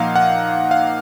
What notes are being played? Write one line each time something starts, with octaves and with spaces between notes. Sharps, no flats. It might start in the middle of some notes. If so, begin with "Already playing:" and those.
Already playing: A#2 F3 A#3 D#4 F5 F#5
F#5
F5